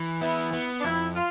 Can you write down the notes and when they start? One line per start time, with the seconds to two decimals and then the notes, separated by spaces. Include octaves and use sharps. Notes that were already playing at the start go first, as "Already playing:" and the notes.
Already playing: E3
0.21 B3 E4
0.53 B3
0.80 D4
0.84 F2 E4
1.16 F4